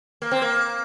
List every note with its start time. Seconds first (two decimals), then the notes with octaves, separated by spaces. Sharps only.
0.22 A#3
0.31 C4
0.42 A#3